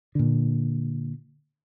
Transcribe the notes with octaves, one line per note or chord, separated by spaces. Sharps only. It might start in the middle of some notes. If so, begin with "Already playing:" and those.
A#2 D3